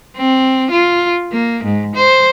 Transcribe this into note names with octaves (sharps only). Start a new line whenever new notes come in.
C4
F4
A#3
G#2
C5